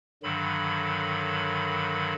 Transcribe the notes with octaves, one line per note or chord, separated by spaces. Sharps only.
G2 D3 D#3 F#3 B5